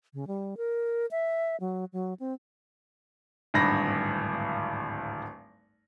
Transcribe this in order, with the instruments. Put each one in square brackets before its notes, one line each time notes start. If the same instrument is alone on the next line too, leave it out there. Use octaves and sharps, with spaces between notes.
[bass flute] C#3
G3
A#4
E5
F#3
F#3
C4
[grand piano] D1 G#1 G2 B5 A#6